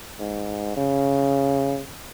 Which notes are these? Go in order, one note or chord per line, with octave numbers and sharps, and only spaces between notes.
G#2
C#3